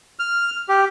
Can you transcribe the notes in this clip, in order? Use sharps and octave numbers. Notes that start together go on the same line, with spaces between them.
F6
G4